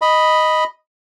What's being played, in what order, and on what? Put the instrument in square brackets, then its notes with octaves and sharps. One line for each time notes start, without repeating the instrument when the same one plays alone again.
[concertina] D#5 B5